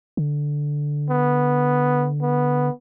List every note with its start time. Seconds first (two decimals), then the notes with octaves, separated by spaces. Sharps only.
0.17 D3
1.10 B3
2.21 B3